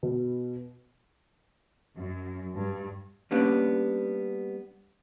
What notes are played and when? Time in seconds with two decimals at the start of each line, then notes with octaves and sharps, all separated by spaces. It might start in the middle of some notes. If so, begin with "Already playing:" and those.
0.03 B2
1.98 F#2
2.54 G2
3.31 G3 A#3 B3 C#4 D4